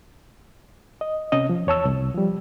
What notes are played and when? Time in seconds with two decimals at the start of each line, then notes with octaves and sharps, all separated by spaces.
1.01 D#5
1.32 C3 C#4 D#5
1.49 F3
1.67 E2 C#5 A5 E6
1.85 C2
2.14 F3 G3